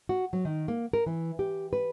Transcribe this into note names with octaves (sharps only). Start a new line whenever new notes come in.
F#4
F#3
D#3
A#3
A#4
E3
G4
B4